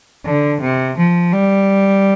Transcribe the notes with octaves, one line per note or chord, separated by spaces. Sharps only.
D3
C3
F3
G3